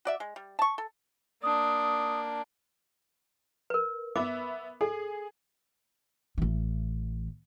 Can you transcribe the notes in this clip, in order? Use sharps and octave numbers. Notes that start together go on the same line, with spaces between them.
F#4 D5 E5
G#3
G3
A5 C#6
A4
A#3 D4 D#6
A#4 B4
B3 E5 D6
G#4 A4
A1 E3